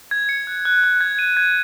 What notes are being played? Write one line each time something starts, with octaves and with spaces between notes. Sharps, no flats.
G#6
C#7
F#6
F#6
F#6
G#6
D#7
G#6